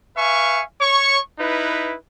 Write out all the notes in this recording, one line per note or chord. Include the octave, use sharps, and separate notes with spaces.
B4 E5 F5 G#5 C#6
C#5 C#6
D#4 E4 B4